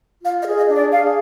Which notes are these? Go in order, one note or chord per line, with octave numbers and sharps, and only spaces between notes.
F4 F5
D#5
G#4
D#5
D4
D5
G#4 F5